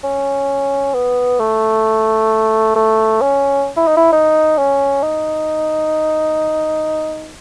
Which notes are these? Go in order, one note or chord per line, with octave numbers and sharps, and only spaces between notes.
C#4
B3
A3
A3
C#4
E4
D#4
E4
D#4
C#4
D#4